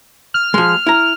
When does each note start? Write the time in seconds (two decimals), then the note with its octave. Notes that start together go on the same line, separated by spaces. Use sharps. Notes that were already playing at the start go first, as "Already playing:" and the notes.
0.34 F6
0.54 F3 G#3
0.87 E4 A#5